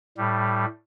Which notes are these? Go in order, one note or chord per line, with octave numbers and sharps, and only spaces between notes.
A2 G3